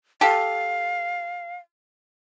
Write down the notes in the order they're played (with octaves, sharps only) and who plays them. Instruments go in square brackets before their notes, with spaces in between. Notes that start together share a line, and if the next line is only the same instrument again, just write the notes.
[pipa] G4 A4 [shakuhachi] F5